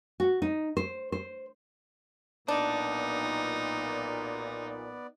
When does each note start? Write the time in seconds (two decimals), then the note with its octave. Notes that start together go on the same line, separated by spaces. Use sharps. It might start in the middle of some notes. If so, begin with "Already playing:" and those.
0.20 F#4
0.42 D#4
0.77 C5
1.12 C5
2.48 B1 A#2 B3 D4 D#4 D5